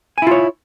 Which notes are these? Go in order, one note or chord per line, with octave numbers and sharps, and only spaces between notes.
E4 F4 C#5 G#5